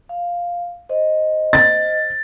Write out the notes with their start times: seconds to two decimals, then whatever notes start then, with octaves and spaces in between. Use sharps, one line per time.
0.09 F5
0.89 C5 D#5
1.53 A6